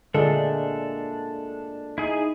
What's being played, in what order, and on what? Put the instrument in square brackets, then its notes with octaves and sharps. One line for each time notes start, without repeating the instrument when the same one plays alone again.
[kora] A#2 G#3 A3 [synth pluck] D3 [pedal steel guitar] D4 A4
[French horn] D#4 [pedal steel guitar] E4 G#4